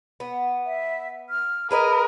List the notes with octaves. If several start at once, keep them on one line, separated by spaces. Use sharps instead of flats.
B3
E5
F6
G#4 A#4 B4 D#5 B5